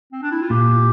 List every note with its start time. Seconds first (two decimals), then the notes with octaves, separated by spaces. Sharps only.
0.12 C4
0.22 D4
0.31 E4
0.41 F4
0.50 A#2 G4